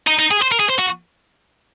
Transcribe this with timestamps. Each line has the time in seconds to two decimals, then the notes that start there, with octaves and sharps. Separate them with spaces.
0.07 D#4
0.19 D#4
0.31 G#4
0.42 C5
0.52 A#4
0.60 G#4
0.69 C5
0.79 F#4